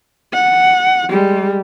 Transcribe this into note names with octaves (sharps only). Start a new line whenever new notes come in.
F#5
G3 G#3